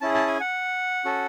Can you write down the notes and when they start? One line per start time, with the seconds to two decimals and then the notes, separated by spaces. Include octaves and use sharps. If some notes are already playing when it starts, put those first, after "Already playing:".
0.01 C#4 E4 G#4 A5
0.14 A5
0.27 G#5
0.40 F#5
1.05 C#4 F#4 A4